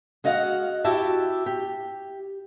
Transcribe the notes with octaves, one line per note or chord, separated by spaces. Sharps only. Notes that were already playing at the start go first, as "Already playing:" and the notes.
G#3 F#4 D#5 F5 F#5
E4 F#4 G4 E5 A5
G4